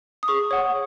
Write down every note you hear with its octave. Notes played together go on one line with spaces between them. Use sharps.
D#6
G#4 C#6
C#5 F#5